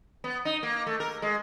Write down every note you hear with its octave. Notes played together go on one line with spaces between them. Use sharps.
B3
D#4
A#3
A3
A#4
G#3